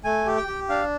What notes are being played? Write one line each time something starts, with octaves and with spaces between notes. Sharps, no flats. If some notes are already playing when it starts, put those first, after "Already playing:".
A3 G#5
G4
G5
G4
D4 F5